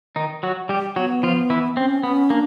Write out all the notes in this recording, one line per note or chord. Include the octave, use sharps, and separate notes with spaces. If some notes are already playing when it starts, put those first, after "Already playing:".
D#3 D#4
F#3 F#4
G3 G4
F#3 B3 F#4
F3 F4
E3 E4
C4 C#4
B3 C#4
A#3 D4